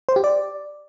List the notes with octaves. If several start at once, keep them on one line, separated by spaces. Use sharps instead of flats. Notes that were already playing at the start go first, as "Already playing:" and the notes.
C5
G4
D5